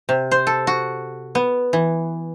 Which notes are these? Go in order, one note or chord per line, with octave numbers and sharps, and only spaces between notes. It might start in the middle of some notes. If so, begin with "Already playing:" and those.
C3
C5
A4
F#4
B3
E3